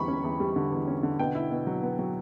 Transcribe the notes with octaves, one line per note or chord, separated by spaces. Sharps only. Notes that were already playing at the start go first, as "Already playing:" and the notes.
Already playing: E2 D3 G3 B5 C#6
C#4
E2
G3
D3
E2
C#4
D3
B2 G5
E4
B2
F#3
B3
F#3